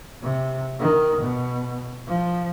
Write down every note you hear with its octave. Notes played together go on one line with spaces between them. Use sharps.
C3
D#3
B2
F3